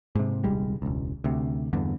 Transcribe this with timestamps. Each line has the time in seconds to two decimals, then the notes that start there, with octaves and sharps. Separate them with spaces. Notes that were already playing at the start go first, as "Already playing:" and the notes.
0.15 G#2 C3
0.44 D#1 C2 G3 G#3
0.82 E1 C#2
1.24 D2 C3
1.73 E2 G2 D3